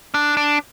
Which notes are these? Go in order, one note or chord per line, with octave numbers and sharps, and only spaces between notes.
D4
D4